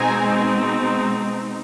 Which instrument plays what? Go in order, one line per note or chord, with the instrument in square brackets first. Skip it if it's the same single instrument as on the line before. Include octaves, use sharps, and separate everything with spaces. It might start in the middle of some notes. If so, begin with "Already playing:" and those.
Already playing: [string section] B2 G#3 C4 D#4 G#5 A#5